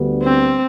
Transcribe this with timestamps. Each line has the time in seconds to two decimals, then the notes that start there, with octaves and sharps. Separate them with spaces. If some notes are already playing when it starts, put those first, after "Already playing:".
Already playing: D2 D3 G3 B3
0.23 C4